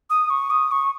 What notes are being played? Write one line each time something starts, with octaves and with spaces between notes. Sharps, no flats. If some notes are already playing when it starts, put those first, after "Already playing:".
D#6
C#6
D#6
C#6